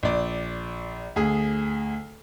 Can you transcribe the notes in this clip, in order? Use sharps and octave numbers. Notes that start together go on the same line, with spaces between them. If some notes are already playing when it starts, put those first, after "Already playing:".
A#1 D5
D2 G#4